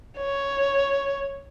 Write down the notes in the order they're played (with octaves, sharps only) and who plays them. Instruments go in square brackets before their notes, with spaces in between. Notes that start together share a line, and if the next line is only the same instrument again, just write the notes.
[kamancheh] C#5